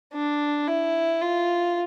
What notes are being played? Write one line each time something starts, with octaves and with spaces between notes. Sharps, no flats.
D4
E4
F4